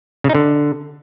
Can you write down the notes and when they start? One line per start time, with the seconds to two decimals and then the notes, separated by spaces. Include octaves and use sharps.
0.24 C#3
0.29 D#4
0.35 D3